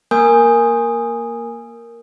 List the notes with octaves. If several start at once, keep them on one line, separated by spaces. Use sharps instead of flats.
A#3 A#4 G#5 D#6 G6